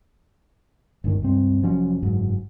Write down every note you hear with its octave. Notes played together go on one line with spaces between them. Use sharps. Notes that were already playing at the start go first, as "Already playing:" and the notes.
G1 C#2 D#3
C#2 G2 C4
F1 F3 F#3 C#4
F#1 G#2 F#3